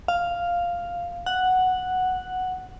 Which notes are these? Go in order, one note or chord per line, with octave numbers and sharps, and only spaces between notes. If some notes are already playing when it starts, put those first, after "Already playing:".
F5
F#5